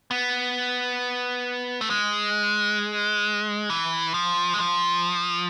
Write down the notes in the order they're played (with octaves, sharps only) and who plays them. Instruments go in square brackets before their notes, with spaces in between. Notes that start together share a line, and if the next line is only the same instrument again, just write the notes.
[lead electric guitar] B3
A3
G#3
E3
F3
G#3
F3